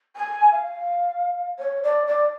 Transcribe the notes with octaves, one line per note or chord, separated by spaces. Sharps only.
G#5
F5
C#5
D5
D5